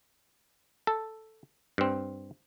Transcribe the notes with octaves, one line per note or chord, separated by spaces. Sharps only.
A4
G2 C4